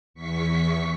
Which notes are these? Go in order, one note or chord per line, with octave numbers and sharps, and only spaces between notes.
E2 C#6 B6